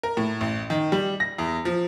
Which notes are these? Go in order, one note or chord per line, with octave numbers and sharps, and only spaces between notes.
A#4
A2
A1
D#3
G3
A#6
E2
F3